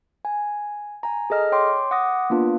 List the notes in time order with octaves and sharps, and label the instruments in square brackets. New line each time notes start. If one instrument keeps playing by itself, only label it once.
[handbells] G#5
G#5 A#5
G#4 A4 D#5 F6
C#5 G5 C6 D6
F#5 D6 D#6 A#6
A#3 B3 D4 F4 B4